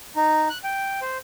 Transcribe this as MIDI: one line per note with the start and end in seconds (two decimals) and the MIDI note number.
0.16 0.48 63
0.50 0.58 90
0.64 1.00 79
1.01 1.18 72